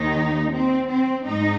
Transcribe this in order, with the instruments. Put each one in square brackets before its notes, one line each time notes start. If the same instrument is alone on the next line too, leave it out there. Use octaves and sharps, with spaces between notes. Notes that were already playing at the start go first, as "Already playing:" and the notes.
Already playing: [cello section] D#2 D#3 D#4
C4
C4
G#2 D#4